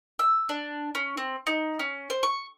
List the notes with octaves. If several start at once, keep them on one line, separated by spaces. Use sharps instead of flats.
E6
D4
C#4
C4
D#4
C#4
C5
C#6